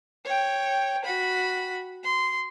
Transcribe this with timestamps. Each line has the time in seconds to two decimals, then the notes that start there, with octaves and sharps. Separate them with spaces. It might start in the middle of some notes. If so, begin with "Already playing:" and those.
0.25 C#5 G5
1.04 F#4 B5
2.03 C6